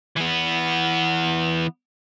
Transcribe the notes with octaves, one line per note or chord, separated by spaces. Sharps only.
E3 B3